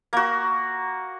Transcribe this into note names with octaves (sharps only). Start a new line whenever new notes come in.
A#3 F#4